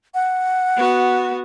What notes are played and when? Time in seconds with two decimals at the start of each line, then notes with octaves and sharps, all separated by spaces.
0.14 F#5
0.77 B3 F#4